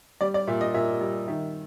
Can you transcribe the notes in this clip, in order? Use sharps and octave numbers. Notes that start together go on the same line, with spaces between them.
G3 D5
D5
A#2 E5
D#5
A#2 E5
G3
D#3 E5